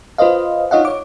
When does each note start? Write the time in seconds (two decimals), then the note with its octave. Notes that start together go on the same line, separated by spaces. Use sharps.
0.18 F4 B4 C5 D#5 F5
0.71 D#4 F4 C#5 D#5 F5 F#5
0.85 C#5 D6